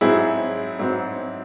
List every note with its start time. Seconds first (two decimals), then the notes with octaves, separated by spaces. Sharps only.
0.01 G#2 F#3 C4 E4 G#4
0.79 G#2 F#3 C4